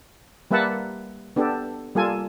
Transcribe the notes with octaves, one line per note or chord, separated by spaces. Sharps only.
G3 A#3 B4 E5 F#5 A5
B3 D4 G4 A4
G3 A#3 F4 A4 G#5